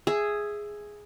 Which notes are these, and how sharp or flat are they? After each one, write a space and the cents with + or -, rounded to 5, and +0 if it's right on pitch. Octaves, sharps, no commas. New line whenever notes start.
G#4 +0 E5 +10